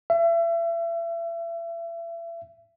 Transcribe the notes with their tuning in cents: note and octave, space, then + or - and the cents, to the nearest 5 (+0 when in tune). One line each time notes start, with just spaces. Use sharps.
E5 +35